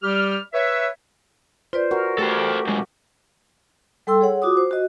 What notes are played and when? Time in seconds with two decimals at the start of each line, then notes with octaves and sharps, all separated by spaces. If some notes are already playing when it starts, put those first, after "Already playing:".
0.02 G3 G4 F6
0.53 B4 C#5 E5
1.73 F4 B4 C5 D5
1.91 F#4 A#4
2.18 A3 G4 A4 C5
2.67 B1 G#3
4.07 G3 A4 G5 C6 E6
4.21 G#4 C#5 F#5
4.42 F4 F#4 D6 D#6
4.57 C5
4.71 F#4 D#5